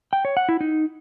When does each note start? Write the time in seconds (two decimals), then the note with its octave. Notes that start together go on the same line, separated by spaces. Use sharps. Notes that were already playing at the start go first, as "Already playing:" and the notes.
0.13 G5
0.25 C#5
0.37 F#5
0.49 E4
0.61 D#4